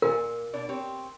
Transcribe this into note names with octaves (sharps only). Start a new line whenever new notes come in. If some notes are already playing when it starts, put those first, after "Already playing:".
A#2 A#4 F5 G#5
B2 D4 D5
C4 G4 C#5